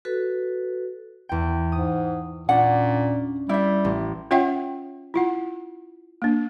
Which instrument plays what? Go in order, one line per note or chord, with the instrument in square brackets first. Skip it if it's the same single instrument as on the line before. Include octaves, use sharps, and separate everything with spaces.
[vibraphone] F#4 A4 B4
[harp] E2 G5
[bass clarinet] G#2 [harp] D#6
[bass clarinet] A#2 [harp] C#4 D4 [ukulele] F#5
[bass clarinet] G3 [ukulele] E4 E5
[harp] A1
[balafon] C#4 F4 C#5 E5 F#5 G5
E4 F4 F#5
A#3 D4